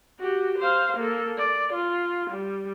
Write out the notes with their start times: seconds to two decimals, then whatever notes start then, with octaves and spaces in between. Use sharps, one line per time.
0.19 F#4 G4
0.59 C5 F5
0.97 A#3 A4
1.37 D5
1.73 F4
2.31 G3